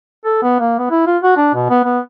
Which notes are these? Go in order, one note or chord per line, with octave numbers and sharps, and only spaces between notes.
A4
B3
A#3
B3
E4
F4
F#4
D4
B2
B3
B3